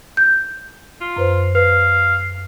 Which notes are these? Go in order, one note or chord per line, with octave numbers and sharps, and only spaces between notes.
G6
F4
F#2 B4 C5
B4 F5